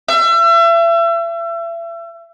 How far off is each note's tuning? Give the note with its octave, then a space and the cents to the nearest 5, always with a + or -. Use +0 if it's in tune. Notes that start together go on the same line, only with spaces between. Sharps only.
E5 +35